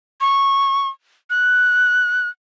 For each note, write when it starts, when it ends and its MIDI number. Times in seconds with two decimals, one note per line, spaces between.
0.21 0.88 85
1.30 2.29 90